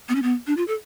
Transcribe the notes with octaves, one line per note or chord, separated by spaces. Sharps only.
B3
C#4
B3
D4
F4
A4